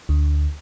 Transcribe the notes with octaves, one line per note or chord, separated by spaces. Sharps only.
D2